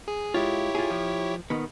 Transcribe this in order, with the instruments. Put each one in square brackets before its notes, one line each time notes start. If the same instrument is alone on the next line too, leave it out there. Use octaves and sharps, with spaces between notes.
[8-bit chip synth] G#4
[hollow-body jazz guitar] G#3 F4 [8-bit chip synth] E4 G4 C#5
[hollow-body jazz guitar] F4 G#4
F3
B2 D#3 B3